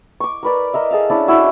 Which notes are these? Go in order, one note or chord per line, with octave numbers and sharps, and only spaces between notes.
C#6 D6
A#4 B4 D5
A#4 D#5 E5
G#4 A4 E5 F5
C#4 D4 E4 D5
E4 F#4 E5